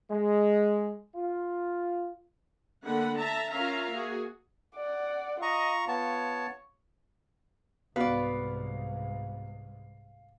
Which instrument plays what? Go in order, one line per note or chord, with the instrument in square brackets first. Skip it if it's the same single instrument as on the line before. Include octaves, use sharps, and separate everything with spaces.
[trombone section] G#3
F4
[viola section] D3 A3 A#3 F#5 B5
E5 A5 A#5
C#4 F4 A#4 E5 F5 A#5
A#3 F#4 G#4
[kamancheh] D5 F#5
[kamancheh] F4 [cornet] D#5 [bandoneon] A#5 C#6
[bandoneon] B3 A5 [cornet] C#5
[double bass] C2 G#2 [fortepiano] B3 F#4 [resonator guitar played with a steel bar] B4 D5 [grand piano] F5